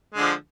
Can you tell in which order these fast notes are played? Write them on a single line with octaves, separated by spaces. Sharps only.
G#3 D3 F3